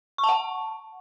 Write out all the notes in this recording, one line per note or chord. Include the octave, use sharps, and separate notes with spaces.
C#6
A5
F#5